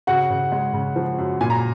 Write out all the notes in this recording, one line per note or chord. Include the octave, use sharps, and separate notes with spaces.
C#3 F#4 F#5
C#3
G#3
C#3
F3
F#2
A#2 G#5
A#5